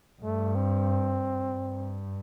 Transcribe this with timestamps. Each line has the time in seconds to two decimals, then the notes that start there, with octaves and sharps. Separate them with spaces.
0.23 G2 A3
0.55 C4
1.51 G2